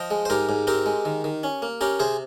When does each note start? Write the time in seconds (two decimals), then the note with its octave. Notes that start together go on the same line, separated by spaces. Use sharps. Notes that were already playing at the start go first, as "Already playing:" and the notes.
Already playing: F3 D#5 G5
0.11 G#3
0.25 C5
0.30 G#2 G4 A#4
0.49 G#2
0.67 C4 G4 A#4
0.86 G#3
1.05 D#3
1.24 D#3
1.43 C#4
1.62 A#3
1.81 C#4 G4 A#4
2.00 C3 G#4 C5